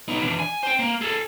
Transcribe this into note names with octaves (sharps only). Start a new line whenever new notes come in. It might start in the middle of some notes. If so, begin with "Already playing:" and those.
B3 D#4
E3 D4
G#5
C5 G5
A#3
G#4 A4